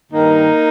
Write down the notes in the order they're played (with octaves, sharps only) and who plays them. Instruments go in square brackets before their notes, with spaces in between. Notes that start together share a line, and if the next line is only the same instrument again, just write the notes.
[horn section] G2 D#3 A#3 D#4